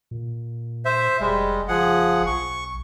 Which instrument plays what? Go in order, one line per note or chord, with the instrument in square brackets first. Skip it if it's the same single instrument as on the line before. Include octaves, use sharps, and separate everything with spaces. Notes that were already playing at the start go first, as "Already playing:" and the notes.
[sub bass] A#2
[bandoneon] C5 E5
[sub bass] F1 [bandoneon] G3 G#3
[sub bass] F#1 [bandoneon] F3 G#4 F#5
[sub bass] B1 [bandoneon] C#6